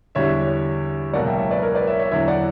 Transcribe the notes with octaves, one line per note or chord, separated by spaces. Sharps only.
E2 D3 G3 C#5 E5
C#2 B2 F#3 A#3 D5 F#5
E5 G5
C#5 E5
B4 D5
A#4 C#5
B4 D5
C#5 E5
C#5 E5
E2 D3 F#3 C#5 E5
D5 F#5